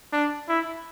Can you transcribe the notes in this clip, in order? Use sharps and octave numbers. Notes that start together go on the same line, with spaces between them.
D4
E4